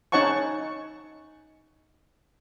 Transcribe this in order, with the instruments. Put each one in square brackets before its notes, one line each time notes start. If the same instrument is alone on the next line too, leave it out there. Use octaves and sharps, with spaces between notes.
[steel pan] C#4 D#4 C#5 F#5 A5 C#6